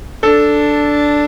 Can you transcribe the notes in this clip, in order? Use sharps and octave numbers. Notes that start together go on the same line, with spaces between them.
D4 A4